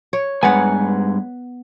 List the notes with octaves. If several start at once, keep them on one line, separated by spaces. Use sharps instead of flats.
C#5
G2 G#3 B3 F#5 G#5